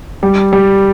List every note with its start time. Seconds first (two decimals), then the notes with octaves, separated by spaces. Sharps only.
0.23 G3
0.53 G3